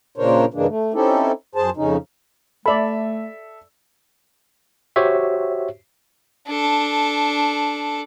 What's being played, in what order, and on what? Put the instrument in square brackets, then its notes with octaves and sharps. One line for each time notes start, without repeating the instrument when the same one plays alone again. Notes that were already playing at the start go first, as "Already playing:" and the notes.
[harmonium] A#2 C#3 D4 A#4 C5 C#5
G2 C#3 E3 G#3 A#3 D4
A3
C4 C#4 D#4 E4 G4 A4
F#2 G#4 C5 A5
F2 C#3 C#4 D#4
[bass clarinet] A3 [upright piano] A4 E5 [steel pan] D5 B5
[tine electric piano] F#4 G4 C5 C#5 E5
[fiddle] D4 A4